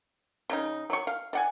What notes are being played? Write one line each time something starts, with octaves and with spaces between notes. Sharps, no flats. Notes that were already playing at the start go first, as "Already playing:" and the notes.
C#3 D#4
F#3 C#6
F5
D5 F#5 G#5